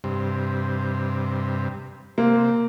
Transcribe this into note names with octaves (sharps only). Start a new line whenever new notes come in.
G2 C3
C3 A#3